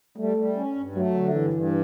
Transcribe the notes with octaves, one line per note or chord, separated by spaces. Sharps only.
G3 A3
G3
C#4
G2
F#3 A3
D3
G2 E3
G2